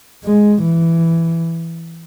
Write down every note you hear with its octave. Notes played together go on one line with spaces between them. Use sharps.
G#3
E3